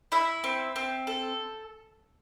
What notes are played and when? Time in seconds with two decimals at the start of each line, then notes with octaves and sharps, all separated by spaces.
0.12 E4 E5
0.44 C4
0.76 C4
1.07 A4